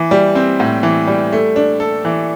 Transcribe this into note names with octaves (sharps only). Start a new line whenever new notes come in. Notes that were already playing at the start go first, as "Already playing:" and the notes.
Already playing: E3
G3
C4
A2
E3
G3
A3
D4
A4
E3